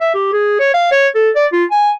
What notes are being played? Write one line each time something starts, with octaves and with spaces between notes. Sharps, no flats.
E5
G4
G#4
C#5
F5
C#5
A4
D5
F4
G#5